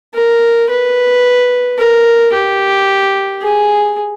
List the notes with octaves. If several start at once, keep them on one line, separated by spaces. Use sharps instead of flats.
A#4
B4
A#4
G4
G#4